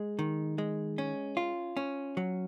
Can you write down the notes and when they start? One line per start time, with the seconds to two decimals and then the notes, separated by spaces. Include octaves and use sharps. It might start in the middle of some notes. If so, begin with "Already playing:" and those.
Already playing: G#3
0.19 D#3
0.58 G#3
0.98 C#4
1.37 F4
1.77 C#4
2.17 F#3